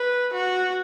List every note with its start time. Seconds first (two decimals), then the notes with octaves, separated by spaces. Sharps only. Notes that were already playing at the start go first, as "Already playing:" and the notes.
Already playing: B4
0.33 F#4